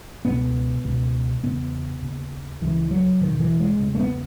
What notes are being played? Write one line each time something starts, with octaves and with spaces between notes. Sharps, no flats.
C#2 B2 B3
C#2 B2
E2 C#3 B3
D#2 C#3
C#2 C#3 E3
F#3
E2 B2 D#3
E3
G#3
E2 C#3
A3
B3